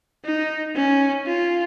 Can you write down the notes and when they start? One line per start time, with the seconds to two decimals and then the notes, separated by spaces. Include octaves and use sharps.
0.25 D#4
0.75 C#4
1.26 F4